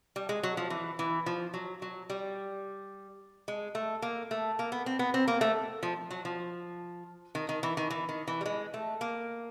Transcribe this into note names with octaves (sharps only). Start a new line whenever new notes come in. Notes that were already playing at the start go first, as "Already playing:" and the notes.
G3
G#3
F#3
F3
E3
E3
F3
F#3
F#3
G3
G#3
A3
A#3
A3
A#3
B3
C4
B3
C4
A#3
A3
F3
F#3
F3
D#3
D#3
E3
D#3
E3
D#3
E3
G3
G#3
A3
A#3